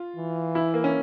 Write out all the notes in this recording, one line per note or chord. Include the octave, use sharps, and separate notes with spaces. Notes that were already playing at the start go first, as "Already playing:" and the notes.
Already playing: F4
E3
E4
A#3
C#4